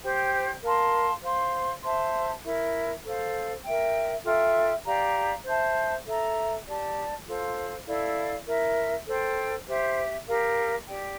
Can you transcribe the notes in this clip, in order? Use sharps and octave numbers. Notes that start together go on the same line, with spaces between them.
G4 C5 G5
A#4 F5 A5 C6
C5 F5 C6
C5 E5 A5 C6
E4 A#4 E5
A4 C5 F5
A#4 E5 G5
F4 A4 E5 G5
G4 D5 F5 A#5
C5 E5 A5
A4 E5 A#5
G4 D5 A5
F4 A4 C5 F5
E4 A4 D5 F5
E4 A#4 E5
A4 C5 G5
G4 C5 E5
G4 A#4 F5
G4 D5 G5